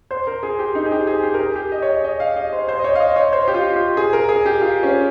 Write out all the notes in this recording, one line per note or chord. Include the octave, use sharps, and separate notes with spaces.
C5
A#4
G#4
G4
D#4
G#4
G4
G#4
G4
A#4
G#4
G4
D#5
C#5
D#5
D#5
F5
D#5
C5
C5
D#5
C#5
F5
D#5
C#5
C5
G4
F4
G4
G#4
A#4
G#4
G4
F4
C#4